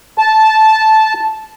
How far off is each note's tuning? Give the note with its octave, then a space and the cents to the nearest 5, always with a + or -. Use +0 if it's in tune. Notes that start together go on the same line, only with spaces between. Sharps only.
A5 -10